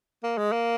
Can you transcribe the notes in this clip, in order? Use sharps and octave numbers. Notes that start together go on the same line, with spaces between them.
A#3
G#3
A#3